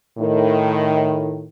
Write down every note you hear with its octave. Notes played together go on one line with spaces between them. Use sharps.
A2 D#3